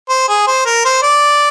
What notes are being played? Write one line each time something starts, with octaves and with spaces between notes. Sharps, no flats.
C5
G#4
C5
A#4
C5
D5